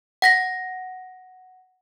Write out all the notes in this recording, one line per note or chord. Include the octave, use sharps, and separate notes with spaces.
F#5 A#6 B6